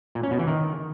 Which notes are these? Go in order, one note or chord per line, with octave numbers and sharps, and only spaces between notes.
A#2
C#4
B2
E3
D#3